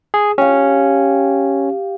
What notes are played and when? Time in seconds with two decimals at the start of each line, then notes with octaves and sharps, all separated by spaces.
0.14 G#4
0.38 C#4 G4 F5